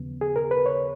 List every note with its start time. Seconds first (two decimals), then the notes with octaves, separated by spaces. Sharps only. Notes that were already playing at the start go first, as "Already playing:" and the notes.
Already playing: D#2 C#3 F3 B3
0.21 G#4
0.36 A#4
0.51 B4
0.66 C#5